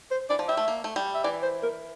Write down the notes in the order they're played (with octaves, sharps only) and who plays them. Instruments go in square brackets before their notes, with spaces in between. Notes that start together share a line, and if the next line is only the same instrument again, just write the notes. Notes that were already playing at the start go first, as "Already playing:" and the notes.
[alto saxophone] C5
[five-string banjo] E3 [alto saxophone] D5
[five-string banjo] F3
[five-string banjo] G3 [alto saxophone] E5
[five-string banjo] A3
A#3
A3
G3
[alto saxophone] E5
[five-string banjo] E3 [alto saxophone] D5
[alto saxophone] C5
A#4